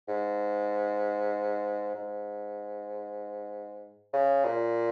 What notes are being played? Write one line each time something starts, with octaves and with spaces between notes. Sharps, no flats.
G#2
G#2
C#3
A#2